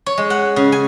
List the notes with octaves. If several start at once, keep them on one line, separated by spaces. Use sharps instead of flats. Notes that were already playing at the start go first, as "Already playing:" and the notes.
C#5
G#3
F#5
C#3
G#5